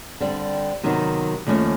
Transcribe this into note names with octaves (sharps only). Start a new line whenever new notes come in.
D3 G3 C4
C3 D#3 F#3 B3 D#4
D#2 C#3 F3 A3 C#4